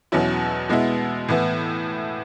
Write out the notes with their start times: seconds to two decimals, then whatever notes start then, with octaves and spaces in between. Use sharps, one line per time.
0.12 E2 B2 F#3 C#4 E4
0.69 B2 G#3 B3 E4
1.29 A2 E3 B3 E4